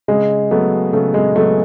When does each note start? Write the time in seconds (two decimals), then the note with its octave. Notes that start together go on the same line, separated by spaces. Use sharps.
0.08 C#3 G#3
0.51 F#3 A3 B3
0.93 C#3 A3
1.14 G#3
1.36 F#3 A3 B3